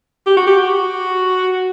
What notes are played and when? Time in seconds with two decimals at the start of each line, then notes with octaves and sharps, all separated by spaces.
0.26 G4
0.37 F#4
0.47 G4
0.59 F#4